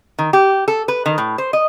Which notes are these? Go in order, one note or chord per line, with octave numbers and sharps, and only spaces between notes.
D#3
G4
A4
B4
D#3
A2
C5
D#5